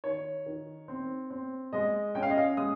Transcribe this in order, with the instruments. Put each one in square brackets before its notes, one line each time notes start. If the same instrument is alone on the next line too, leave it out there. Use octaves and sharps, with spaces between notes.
[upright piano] D#3 C#5
D#3
C4
C4
G#3 D#5
C#4 G5
F5
D#5
F5
G#3 D#6